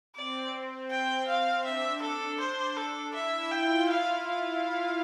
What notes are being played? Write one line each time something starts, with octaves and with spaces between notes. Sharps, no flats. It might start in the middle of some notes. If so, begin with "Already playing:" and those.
C4 D5
G5
F5
D4 E5
A4
C5
A4
E4 E5
F4 G5
F5
F5